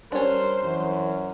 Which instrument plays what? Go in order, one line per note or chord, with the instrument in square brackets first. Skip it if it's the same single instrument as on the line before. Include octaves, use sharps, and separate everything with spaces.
[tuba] G3 [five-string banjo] C#4 D4 [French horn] A#4 [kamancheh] C5
[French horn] F#2 [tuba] E3